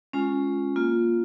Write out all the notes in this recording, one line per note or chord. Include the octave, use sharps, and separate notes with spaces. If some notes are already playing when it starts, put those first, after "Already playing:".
G#3 C#4 F4
A#3 F4